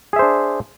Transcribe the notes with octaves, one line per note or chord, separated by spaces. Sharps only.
D4 G#4 C5 E5